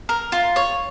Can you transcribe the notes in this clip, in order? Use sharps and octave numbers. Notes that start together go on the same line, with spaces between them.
A#4
F4
C#5